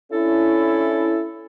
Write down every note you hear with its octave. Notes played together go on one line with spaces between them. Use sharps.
C#4 D4 E4 A4